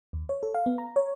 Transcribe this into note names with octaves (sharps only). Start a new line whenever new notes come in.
D#2
C#5
A4
F5
B3
A#5
C#5